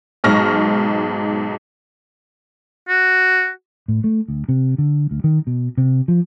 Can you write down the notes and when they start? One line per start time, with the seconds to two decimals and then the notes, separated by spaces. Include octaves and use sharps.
0.24 B1 G#2 C#6 F6 A#6
2.89 F#4
3.88 A2
4.04 A3
4.28 D2
4.49 C3
4.78 D3
5.11 D2
5.24 D#3
5.47 B2
5.78 C3
6.08 F3